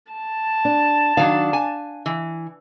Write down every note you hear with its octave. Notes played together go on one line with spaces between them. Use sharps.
A5
D4
D#3 F#3 D4 F5
G#5
E3